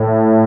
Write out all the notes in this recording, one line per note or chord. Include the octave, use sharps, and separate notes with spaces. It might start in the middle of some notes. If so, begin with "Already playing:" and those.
Already playing: A2